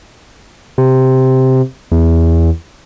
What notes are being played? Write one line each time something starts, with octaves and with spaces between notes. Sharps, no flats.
C3
E2